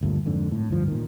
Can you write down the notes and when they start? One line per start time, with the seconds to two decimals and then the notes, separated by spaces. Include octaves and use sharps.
0.01 G1 D2 G2 A#2
0.25 F2 G#2 D3
0.51 A2
0.70 D2 G2 F3
0.88 A#2 D#3